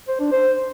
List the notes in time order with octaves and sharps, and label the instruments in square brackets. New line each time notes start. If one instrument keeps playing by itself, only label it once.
[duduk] C5
D4
C5